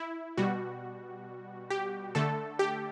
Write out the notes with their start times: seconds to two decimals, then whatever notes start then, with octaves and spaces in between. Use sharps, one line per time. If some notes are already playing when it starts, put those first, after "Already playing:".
Already playing: E4
0.37 B2 G3 F#4
1.70 G4
2.15 D3 A3 A4
2.59 G4